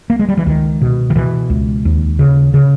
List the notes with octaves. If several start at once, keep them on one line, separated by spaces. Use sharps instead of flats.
A#3
G#3
G3
E3
C#2 D#3
B2
D#3
B2 E3
C#2
D#2
C#3
C#3